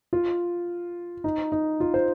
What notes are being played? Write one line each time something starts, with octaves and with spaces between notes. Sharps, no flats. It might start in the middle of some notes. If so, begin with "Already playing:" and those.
F4
D#4
D#4
F4
C5